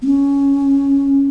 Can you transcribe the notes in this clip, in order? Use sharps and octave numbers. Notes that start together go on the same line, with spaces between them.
B3
C#4